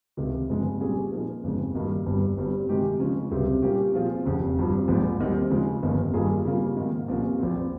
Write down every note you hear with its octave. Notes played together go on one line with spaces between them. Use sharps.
C#2 C3 D#3
G1 F2 C#3 G#3
A#2 G3 C#4 G#4
A#2 F3 A#3 D#4 A#4
G1 F2 C#3 G#3
G2 D#3 A#3
G1 G2 G3
G1 G2 G3 C4
C3 D#3 G#3 D#4 G4
C#3 F3 G#3 C#4
C#2 C3 G3 C4
A#2 G3 A#3 C#4 G4
A#2 F3 C4 F4 G#4
F1 F2 C#3
G#1 G2 F3
A#1 G#2 F3 G#3
D#2 D#3 G3 C4
C#3 F3 G#3
G1 F2 D#3 A#3
G2 D#3 A#3 F4 G#4
C#3 G3 A#3 F4
G#2 D#3 A#3
C2 A#2 F3 A#3 C#4
A#1 A#2 F3 C4